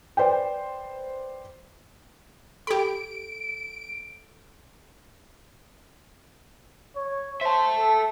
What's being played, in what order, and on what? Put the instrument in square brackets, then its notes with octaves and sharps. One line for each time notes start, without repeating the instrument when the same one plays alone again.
[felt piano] B4 C5 D5 G5
[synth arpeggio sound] G4 B5 [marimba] A4 [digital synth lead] D7
[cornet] C#5
[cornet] C5 [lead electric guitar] E5 A5
[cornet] A4